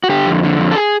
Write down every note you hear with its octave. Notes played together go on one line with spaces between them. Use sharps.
F#4
D3 G4
F2
D3
F2
A4
G#4